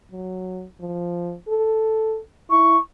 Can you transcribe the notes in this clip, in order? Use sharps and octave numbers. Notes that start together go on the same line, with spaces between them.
F#3
F3
A4
E4 C#6